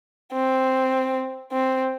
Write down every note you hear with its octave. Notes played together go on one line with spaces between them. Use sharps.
C4
C4